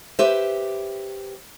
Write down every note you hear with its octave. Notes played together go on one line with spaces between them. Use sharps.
G4 B4 C5 E5